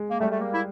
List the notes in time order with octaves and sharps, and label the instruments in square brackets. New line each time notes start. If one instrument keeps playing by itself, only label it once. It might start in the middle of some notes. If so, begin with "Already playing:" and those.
Already playing: [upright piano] G#3
[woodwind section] A#3
[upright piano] G3 [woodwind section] A3
[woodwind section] A3
A#3
E4